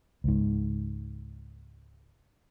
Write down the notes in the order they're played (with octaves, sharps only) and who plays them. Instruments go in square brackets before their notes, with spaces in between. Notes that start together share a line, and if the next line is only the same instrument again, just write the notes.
[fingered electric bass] C#2 G#2